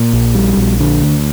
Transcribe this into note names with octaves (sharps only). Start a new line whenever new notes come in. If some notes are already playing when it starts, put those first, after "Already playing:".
Already playing: A#2
A#1
G3
A#1
D3
D2